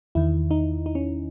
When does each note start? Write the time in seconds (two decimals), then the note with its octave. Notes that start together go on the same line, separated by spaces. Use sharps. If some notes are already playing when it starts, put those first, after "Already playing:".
0.15 E2 D#3 E4
0.51 D#4
0.86 D#4
0.95 C#4